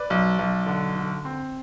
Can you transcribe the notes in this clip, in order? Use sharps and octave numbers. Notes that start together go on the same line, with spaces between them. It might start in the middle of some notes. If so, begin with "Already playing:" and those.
Already playing: B4 D5
B1
B1
D3
D3
C4